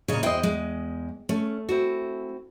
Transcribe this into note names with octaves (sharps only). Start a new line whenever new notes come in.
A#2 C#3 C#5 D#5
E2 E4 C5 D#5 G5
G#3
A3 C#4
C4 E4 F#4